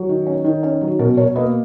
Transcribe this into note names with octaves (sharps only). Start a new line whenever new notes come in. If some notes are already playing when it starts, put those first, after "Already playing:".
Already playing: F#3
D#3
C#4
D#3
C#4
F#3
B2 A#4
B2 A#4 C#5
A#3 B4 D#5